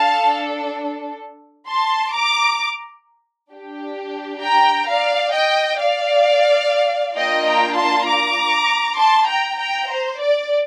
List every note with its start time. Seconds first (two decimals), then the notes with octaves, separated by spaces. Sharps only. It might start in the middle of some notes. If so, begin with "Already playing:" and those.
Already playing: D4 A4 F5 A5
1.69 A5 C6
2.15 A#5 D6
3.51 D4 G4
4.42 G5 A#5
4.88 D5 F5
5.34 D#5 G5
5.79 D5 F5
7.16 A#3 D4 F4 D#5 G5
7.46 G5 A#5
7.76 A5 C6
8.07 A#5 D6
8.98 A5 C6
9.29 G5 A#5
9.59 G5 A#5
9.89 C5
10.20 D5